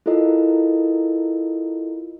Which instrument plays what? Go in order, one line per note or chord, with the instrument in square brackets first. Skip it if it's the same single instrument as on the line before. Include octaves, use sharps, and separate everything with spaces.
[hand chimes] E4 F4 A4 A#4 D#5